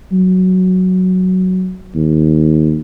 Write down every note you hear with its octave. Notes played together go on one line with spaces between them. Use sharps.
F#3
D#2